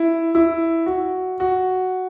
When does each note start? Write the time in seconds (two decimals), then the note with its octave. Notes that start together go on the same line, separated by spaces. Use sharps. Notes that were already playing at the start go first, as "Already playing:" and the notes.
Already playing: E4
0.35 E4
0.86 F#4
1.40 F#4